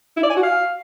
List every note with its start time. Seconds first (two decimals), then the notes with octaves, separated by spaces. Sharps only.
0.17 E4
0.23 D5
0.30 G#5
0.37 F#4
0.43 F5